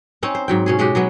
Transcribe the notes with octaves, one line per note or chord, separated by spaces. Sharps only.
C4 C#4 D#4
C5
G#2 F#3 G5
B2 C#4 G#4
B2 G#3 F#4 G4
F#3 G#3 B3